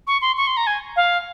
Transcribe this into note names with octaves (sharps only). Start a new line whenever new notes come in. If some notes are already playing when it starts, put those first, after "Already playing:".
C#6
C6
C#6
C6
A#5
G#5
F5